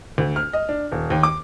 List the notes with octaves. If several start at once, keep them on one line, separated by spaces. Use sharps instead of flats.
D2
F6
D#5
D4
D#1
D#2
D6